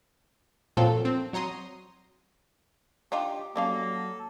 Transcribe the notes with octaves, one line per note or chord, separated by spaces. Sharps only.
A#2 F3 F#3 C4 F4 A4
C4
F#3 C#5 A#5 C6 D#6
D4 D#4 F4 G4
F#3 G3 A#3 C#4 A4 F5